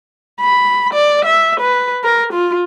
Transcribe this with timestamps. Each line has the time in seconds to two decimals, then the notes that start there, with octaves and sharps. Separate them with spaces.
0.41 B5
0.94 D5
1.25 E5
1.61 B4
2.04 A#4
2.33 F4